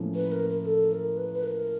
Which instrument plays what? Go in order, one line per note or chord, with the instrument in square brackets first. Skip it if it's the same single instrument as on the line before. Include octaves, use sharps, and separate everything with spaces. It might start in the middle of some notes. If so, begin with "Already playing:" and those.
Already playing: [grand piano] A2 F3 A#3 C#4
[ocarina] B4
A#4
A#4
A#4
A4
A#4
B4
B4
A#4